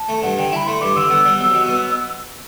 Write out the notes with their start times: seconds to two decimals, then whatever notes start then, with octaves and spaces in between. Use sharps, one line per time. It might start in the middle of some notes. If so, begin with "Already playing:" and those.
Already playing: A5
0.09 A3
0.23 G2 F#5
0.38 D3 G5
0.52 E4 B5
0.66 A3 C6
0.81 G2 D6
0.96 D3 E6
1.10 B3
1.25 G3
1.39 B1
1.54 B2
1.68 B3